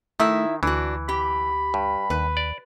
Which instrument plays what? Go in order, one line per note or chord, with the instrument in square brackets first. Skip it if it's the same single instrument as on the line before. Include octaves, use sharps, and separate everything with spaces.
[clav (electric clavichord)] D#3 [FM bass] A3 [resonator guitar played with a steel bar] D#4 E4 E5
[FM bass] D2 [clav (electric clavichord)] E3 [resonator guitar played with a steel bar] D4 F#4
[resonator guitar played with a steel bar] G4 [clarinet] B5
[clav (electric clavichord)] G2
[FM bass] D#2 [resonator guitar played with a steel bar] B4
[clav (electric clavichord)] D5